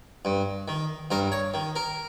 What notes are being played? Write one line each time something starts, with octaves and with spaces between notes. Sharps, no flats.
G2
D#3
G2 A#4
C#5
D#3
A#4